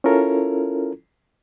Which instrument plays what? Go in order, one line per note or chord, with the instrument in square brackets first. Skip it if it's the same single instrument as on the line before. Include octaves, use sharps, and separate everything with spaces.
[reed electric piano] C#4 E4 F4 A4 A#4